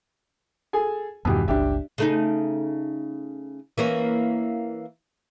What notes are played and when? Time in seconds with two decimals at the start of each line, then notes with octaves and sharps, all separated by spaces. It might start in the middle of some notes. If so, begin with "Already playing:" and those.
0.73 G#4 A4 G#5
1.25 E2 G2 B2 D#3 E3 G4
1.48 G1 C#2 D4 G4 E5
1.98 C#3 A3 D#4
3.78 E3 A#3 C#4